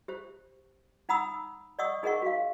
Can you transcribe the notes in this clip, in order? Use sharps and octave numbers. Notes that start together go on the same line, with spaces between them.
G4 C5
D#4 F#5 A#5 B5 D#6 E6
D5 D#5 F#5 C#6 D#6 E6
D#4 G#4 A#4 D#5 F#5 C#6
F#4 F5